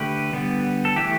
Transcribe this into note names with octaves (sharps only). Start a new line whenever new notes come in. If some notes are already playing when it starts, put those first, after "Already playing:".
Already playing: D3 A3 G4 B4
D3 G3 B3
A4
E3 A3 G4